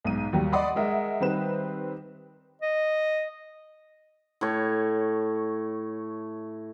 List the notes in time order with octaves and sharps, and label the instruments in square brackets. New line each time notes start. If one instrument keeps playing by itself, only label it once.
[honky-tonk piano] B1 G#2 D#7
D#2 F#3 G3
D5 D#5 F#5 B5 C6 D#6
G#3 A#4 E5 F#5
D#3 G3 C4 B4 E7
[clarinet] D#5
[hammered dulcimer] A2 C#5